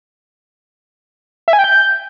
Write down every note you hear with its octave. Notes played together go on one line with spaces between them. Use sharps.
E5
G#5
G5
G6